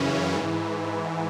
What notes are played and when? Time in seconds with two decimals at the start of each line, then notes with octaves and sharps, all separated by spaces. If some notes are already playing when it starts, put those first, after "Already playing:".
Already playing: F#2 C#3 E3 C#4
0.34 G#2 E3